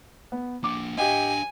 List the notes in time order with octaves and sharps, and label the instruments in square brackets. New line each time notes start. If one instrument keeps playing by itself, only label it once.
[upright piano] B3
[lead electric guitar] A#3 D4 [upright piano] D6
[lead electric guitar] D4 F5 [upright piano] G4 D#5 [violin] G#5